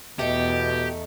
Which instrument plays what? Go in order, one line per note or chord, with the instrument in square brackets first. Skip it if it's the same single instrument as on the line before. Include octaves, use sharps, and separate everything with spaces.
[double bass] E2 [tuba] B2 [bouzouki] A3 D#4 [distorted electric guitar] G4